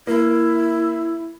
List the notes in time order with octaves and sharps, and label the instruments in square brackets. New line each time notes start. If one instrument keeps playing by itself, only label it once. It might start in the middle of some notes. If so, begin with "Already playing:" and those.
[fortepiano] A#3 [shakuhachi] E4